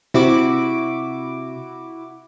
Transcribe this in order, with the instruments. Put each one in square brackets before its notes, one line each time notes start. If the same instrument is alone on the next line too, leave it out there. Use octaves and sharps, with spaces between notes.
[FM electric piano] C3 [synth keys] E4 F#4 D6